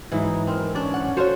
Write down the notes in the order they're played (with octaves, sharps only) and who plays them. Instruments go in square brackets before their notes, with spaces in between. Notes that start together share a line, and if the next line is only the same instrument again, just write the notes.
[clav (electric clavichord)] G#2 E3 F#3 [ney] D#4 [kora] E4
[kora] C4 [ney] A#4
[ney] C#4 [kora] D4 D5
[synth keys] F#5
[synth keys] F#4 C#5 [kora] A4 C5 F5